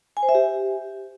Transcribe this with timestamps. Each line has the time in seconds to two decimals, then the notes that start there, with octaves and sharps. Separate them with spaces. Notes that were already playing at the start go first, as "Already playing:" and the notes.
0.17 G#5
0.23 C5
0.29 E5
0.35 G4